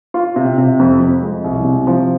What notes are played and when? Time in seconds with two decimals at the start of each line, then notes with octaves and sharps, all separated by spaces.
0.14 F4
0.36 C3
0.58 C3
0.79 F2
1.01 F2
1.22 G#3
1.44 C2
1.64 C3
1.87 F3